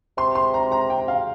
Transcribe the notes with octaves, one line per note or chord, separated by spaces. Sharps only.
C3 C6
C6
A#5
A#5
G5
F5